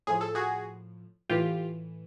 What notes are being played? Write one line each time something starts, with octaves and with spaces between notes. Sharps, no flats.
A2 F3 G#4
A4
F#4 G#4
A2 E3 F4 G4